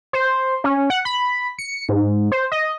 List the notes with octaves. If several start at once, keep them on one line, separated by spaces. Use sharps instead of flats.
C5
C#4
F#5
B5
C#7
G#2
C5
D#5